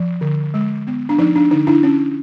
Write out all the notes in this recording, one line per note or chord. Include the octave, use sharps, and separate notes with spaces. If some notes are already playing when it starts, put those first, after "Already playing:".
Already playing: F3
D3
G#3
B3
D4
F3 D#4
D4
D3 D#4
D4 E4
C#4